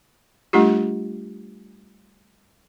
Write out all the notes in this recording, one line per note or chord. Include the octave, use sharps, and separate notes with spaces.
G3 A3 D4 F4 G4